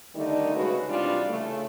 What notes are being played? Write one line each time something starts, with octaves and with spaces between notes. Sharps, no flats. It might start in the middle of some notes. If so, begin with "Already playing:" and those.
D3 D#3 G3 A3 D#4
C#3 G#3 A3 F#4 B4
C3 E3 G3 D4 F4
C#3 A3